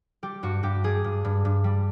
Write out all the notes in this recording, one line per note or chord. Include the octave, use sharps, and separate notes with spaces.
G3 G4
G2 F#4
G2 G4
G3 G#4
G2
G2
G2
G3